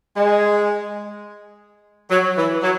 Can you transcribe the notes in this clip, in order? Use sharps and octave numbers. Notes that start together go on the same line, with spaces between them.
G#3
F#3
E3
F#3